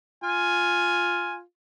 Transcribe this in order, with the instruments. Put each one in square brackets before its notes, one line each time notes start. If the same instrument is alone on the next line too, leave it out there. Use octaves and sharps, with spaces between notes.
[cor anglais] F4 [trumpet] G#5